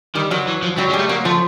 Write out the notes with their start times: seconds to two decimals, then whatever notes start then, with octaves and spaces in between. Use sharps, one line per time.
0.15 D#3 G3
0.31 D#3 F#3
0.47 E3
0.62 F3
0.77 F#3 G3
0.89 G#3
0.93 G3
0.99 A3
1.09 F#3 A#3
1.25 F3 A3